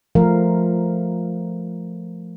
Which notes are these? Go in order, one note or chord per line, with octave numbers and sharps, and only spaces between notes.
F3 A3 A#4 F5